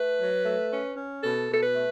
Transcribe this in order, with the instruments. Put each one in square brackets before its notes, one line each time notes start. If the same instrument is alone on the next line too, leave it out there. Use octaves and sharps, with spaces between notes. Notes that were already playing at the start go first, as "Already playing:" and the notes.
Already playing: [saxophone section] A3 B4
F#3
A3
C#4
C#4
B2 A4
B2 A4
B4
A3